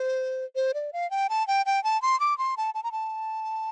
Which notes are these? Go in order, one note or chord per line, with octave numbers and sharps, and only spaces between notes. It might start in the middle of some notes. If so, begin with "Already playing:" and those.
Already playing: C5
C5
D5
F5
G5
A5
G5
G5
A5
C6
D6
C6
A5
A5
A#5
A5